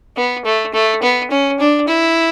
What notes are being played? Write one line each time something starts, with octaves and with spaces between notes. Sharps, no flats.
B3
A3
A3
B3
C#4
D4
E4